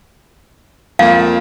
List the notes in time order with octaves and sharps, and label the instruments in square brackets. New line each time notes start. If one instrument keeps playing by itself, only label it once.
[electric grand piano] F2 A#3 [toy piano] F5